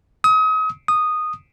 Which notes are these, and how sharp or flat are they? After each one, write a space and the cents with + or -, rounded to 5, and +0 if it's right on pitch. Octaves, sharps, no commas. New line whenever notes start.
D#6 +35
D#6 -10